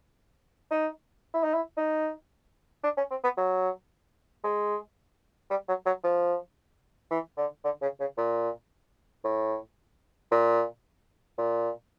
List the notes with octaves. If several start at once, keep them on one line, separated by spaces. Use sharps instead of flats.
D#4
E4
D#4
E4
D#4
D4
C#4
C4
B3
F#3
G#3
G3
F#3
F#3
F3
E3
D3
D3
C#3
C#3
A#2
A2
A#2
A#2